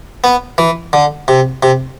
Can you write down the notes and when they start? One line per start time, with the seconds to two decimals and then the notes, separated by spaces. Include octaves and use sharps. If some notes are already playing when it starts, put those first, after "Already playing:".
0.24 B3
0.58 E3
0.93 D3
1.28 C3
1.63 C3